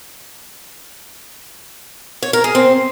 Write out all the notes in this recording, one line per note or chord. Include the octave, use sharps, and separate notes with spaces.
C#5
A#4
G#4
C4